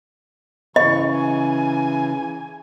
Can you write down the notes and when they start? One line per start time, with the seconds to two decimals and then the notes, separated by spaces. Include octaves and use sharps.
0.76 C#3 E3 D#5 C#6
1.14 G#5